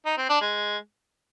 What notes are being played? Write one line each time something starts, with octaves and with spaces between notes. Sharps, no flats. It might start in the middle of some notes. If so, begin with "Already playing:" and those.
D#4
C4
D4
G#3